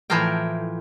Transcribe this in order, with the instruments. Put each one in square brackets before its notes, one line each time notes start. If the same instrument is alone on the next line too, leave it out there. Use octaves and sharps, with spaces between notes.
[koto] A2 E3 F3 A#4 F5 G5